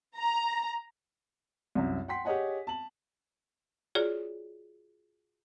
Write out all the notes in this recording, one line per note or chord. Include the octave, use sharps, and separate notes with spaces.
A#5
C2 F#2
F#5 G5 C6 B6
G4 G#4 C#5 D#5 F#5 G#5
A5 F#7
F4 F#4 G#4 C#5 D5